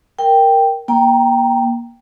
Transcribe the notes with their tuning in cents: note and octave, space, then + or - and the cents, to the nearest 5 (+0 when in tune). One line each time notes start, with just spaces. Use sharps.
A#4 +0 G5 +0
A#3 +30 G5 +0 A#5 +0